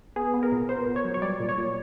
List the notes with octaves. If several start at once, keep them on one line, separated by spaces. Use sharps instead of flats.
B3 G#4
B3
A#4
A#2
B3 C5
A#2
C#5
F#3
C#5
G3 D5
A#2
C#5
A#2